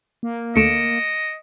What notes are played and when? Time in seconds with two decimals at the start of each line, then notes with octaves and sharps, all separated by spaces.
0.23 A#3
0.56 D2 A3 D#5 C#7 D7 E7